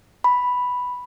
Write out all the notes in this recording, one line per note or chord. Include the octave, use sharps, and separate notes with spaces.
B5